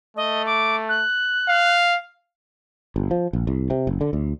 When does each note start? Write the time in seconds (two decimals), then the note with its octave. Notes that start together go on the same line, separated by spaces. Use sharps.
0.17 A3 D#5
0.46 D6
0.89 F#6
1.48 F5
2.96 G1
3.11 F3
3.33 A#1
3.47 C2
3.70 C3
3.87 F#1
4.01 D3
4.13 D2